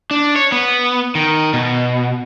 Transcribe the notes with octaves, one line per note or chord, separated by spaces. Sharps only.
D4
C#5
B3
D#3
B2